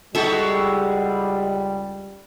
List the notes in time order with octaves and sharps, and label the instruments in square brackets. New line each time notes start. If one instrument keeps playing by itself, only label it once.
[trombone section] C#2 G3 [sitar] G#3 D#4 F#4 [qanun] A4 E5